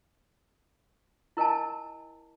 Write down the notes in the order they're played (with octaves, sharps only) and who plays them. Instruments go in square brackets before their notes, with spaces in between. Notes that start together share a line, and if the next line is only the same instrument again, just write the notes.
[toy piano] E4 A#4 D#5 G#5 A5